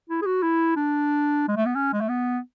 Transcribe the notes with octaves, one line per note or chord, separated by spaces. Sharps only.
E4
G#4
F#4
E4
D4
G#3
A3
B3
C#4
G#3
A3
B3